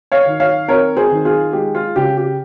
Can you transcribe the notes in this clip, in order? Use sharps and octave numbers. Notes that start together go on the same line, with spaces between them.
C#5 F5
D#3
C#5 F5
C4 A#4 C#5
G#4 C5
D#3
F4 G#4
G#3 G4
F4
C#3 G4
G4